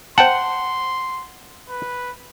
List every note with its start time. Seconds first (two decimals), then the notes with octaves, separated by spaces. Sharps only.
0.18 C5 F#5 G5 A5 C6
1.69 B4